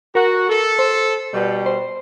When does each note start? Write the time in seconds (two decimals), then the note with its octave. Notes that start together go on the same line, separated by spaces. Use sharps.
0.15 F#4 A#4
0.50 A4
0.79 C5
1.34 B2 G3
1.66 C5